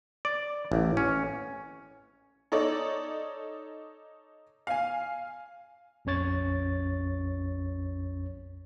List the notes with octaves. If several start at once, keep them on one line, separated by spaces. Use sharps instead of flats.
D5
A1
C#4
D#4 A4 C#5 D5
F5 G#5
A#1 F2 C#4 C#5 A6